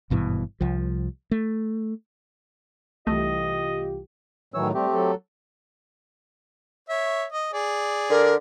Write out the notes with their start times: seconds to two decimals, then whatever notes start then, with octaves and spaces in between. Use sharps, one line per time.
0.10 G#1 G2 B2 E3
0.61 C2 F3
1.31 A3
3.07 C2 E3 A3 F4 G4 D#5
4.54 A2 D#3 E3 F#3 C#5 E6
4.74 G3 A3 C4 G4
4.92 F#3 A4
6.89 C#5 E5
7.32 D#5
7.53 G#4 D5
8.10 D3 A#4